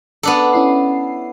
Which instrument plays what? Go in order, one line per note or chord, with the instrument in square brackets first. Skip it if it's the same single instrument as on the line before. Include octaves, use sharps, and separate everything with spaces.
[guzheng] B3 D4 A4
[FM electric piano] C#4 E4 C7